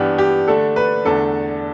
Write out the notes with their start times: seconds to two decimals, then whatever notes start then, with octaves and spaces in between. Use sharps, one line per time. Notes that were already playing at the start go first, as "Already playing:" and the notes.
Already playing: G2 E3 B3 D4 G4
0.18 G4
0.48 D3 A3 D4 A4
0.76 B4
1.05 E2 D3 A3 D4 A4